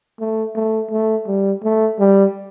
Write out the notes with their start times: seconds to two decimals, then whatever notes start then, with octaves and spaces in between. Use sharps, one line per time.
0.20 A3
0.55 A3
0.91 A3
1.27 G3
1.64 A3
1.99 G3